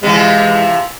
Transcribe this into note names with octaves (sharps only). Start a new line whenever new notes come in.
C3 E3 F3 G#3